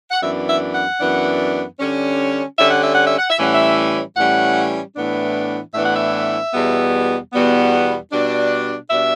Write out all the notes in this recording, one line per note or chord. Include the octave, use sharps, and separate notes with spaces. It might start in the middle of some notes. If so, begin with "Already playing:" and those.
F#5
F#2 E3 B3 D4 E5
E5
F#5
F#2 E3 B3 D4
D3 G3 C#4
D3 G3 C#4 E5
F#5
E5
F#5
E5
F#5
E5
A2 E3 G3 C#4 F#5
E5
A2 E3 G3 C#4 F#5
A2 E3 B3 D4
A2 E3 B3 D4 E5
F#5
E5
E2 B2 G3 B3
E2 B2 G3 B3
B2 G3 D4
B2 G3 D4 E5